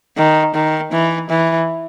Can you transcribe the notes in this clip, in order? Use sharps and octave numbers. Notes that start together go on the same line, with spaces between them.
D#3
D#3
E3
E3